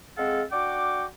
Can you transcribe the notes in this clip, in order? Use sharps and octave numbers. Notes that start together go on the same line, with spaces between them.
G#3 C4 G#4 A4 F5 F#5
D4 F#4 F#5 G5 D6